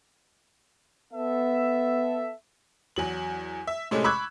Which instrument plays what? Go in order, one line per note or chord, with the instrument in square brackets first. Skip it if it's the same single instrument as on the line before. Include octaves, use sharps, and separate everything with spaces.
[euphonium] B3 [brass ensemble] A4 E5
[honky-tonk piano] E2 F#3 F#7
E5
A2 C3 G#3 A3 C#4
B5 C#6 D6 E6 F#6 G#6